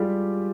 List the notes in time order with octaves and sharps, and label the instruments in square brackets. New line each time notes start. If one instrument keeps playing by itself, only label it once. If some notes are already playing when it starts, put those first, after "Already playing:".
Already playing: [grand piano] G3 G#3 F4 G4 G#4